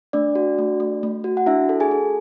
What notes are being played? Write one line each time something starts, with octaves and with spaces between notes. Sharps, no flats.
A3 D4 D5
F#4
A3
A3
A3
F#4
F#5
D4 E4 E5
A4
G#4 G#5
A4